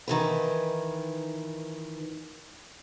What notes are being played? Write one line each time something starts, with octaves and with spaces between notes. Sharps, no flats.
D#3 E3 B4